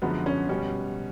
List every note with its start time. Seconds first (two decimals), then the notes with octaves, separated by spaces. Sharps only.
0.02 F#2 D3 F3 G#3 B3
0.26 C#4
0.49 B2 G3 C#4